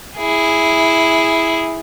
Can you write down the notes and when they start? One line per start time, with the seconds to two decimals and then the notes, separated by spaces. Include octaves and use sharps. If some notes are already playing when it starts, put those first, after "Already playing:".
0.18 E4 G#4